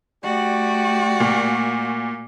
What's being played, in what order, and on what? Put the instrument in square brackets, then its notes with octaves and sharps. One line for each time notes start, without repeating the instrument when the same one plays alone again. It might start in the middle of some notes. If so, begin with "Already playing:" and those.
[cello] A3 F#4 [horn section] G4 D5
[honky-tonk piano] A#2